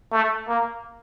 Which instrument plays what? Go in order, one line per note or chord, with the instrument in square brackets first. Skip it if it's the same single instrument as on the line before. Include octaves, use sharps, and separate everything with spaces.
[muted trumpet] A3
A#3